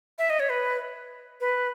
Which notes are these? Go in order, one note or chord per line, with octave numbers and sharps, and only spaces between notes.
E5
D#5
C#5
B4
B4